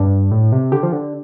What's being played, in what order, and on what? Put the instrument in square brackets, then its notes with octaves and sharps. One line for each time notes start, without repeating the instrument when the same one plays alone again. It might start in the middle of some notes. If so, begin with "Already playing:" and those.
Already playing: [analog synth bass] G2 [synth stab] D4
[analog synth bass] A2
C3
[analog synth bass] D3 [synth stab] G4
[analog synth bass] F3
D3